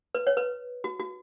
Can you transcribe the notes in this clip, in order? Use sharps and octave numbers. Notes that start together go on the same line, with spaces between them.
B4
C#5
B4
F#4
F#4